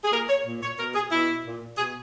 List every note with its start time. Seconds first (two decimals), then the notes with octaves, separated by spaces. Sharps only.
0.04 G#4
0.12 A#2 A#4
0.29 C#5
0.46 A#2
0.63 C#5
0.78 B2 A#4
0.95 G#4
1.11 B2 E4
1.45 A#2
1.78 B2 G#4